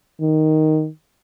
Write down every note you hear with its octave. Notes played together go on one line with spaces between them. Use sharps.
D#3